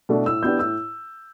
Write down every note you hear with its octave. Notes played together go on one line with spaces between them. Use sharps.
B2 A3 D4
A2 E6
E3 B3 D4 G4 G6
A2 E6